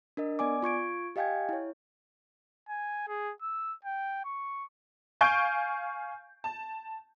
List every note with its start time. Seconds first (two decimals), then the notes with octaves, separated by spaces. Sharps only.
0.17 D4 A#4 D#5
0.39 B3 D5 G#5 D6
0.63 F4 C#6 G#6 D7
1.16 G4 D#5 F5 G5 G#5 G#6
1.49 E4 C#5
2.69 G#5
3.08 G#4
3.43 E6
3.85 G5
4.25 C#6
5.21 F5 G#5 C#6 G6 D7
6.44 A5